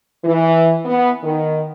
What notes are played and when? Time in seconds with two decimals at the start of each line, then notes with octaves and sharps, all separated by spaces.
0.24 E3
0.85 B3
1.24 D#3